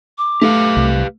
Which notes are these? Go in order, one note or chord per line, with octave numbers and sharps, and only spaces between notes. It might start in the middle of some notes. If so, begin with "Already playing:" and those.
D6
A3 G4 B4 F5
C2